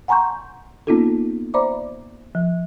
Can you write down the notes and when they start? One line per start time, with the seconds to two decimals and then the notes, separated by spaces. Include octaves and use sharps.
0.08 F#5 G#5 A#5 C6 C#6 G6
0.87 A#3 B3 C#4 D#4 F4 A4
1.54 C5 D5 E5 A#5 B5 D6
2.35 F3